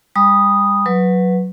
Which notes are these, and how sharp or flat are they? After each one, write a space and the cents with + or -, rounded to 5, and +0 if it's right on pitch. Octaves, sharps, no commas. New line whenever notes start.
G3 +35 B5 -10 D#6 -5
F#3 -10 B4 +0